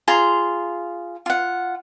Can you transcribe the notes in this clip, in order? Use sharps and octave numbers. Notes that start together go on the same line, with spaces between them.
F4 G#4 A#5 C6
F4 F#5